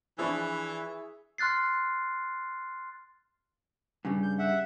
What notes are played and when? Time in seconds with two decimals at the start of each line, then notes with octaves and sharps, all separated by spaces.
0.18 E3 F3 D4 G#4 E5 B5 C#6
1.38 C6 F6 F#6 A6 C7
4.05 G2 C#3 G3
4.23 G6
4.39 E5 F#5